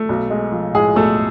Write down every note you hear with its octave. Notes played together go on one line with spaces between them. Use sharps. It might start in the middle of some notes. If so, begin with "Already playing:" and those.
Already playing: A3
B1
G#3
F3
A2 G#3 G#4
B1 A3 A4